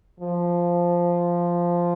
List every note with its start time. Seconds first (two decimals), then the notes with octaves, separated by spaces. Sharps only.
0.20 F3